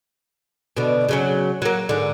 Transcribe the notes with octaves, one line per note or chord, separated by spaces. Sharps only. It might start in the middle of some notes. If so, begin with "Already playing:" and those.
B2 D3
C#3 F#3 C#4
F#3 A#3
G#2 D3